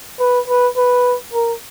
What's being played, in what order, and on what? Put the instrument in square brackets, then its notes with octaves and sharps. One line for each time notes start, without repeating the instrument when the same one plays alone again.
[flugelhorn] B4
B4
B4
A#4